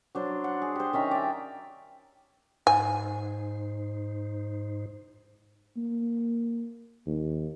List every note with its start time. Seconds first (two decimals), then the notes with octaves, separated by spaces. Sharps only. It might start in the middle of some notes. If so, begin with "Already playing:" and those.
0.15 F#3 D4 C5
0.44 F#5
0.62 G#4
0.75 G4 C5
0.93 D#3 C#4 E5 A#5
1.11 D5 E5
2.67 G#2 D#4 C5 G#5
5.77 A#3
7.07 D#2